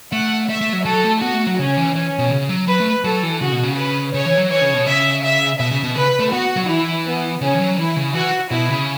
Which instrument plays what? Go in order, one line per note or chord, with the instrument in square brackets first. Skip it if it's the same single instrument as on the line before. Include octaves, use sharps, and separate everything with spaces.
[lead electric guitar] A3 [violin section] F#5
[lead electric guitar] A3 [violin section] E5
[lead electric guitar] A3
F#3
[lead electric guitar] F#3 [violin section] A4
[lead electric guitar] A3
[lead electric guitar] B3 [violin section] F#4
[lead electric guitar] A3
F#3
[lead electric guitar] C#3 [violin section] C#4
[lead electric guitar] E3
[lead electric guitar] E3 [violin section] C#4
[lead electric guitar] B2
C#3
F#3
[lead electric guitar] F#3 [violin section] B4
[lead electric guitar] A3
[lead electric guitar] F#3 [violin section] A4
[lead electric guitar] E3
[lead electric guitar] C#3 [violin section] F#4
[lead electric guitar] B2
C#3
[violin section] B4
[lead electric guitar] C#3 [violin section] C#5
[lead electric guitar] E3
F#3
[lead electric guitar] E3 [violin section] C#5
[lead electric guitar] C#3
B2
[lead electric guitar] C#3 [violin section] E5
[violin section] E5
[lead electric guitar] B2 [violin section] E5
[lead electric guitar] C#3
B2
[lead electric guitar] C#3 [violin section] B4
[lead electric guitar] A3
[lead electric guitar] B3 [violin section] F#4
[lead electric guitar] F#3
[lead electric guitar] E3 [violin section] E4
[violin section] B3
[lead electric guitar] C#3 [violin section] C#4
[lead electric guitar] E3
F#3
[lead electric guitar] E3 [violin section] E4
[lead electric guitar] C#3
[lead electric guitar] E3 [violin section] F#4
[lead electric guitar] B2 [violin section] E4
[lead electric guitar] C#3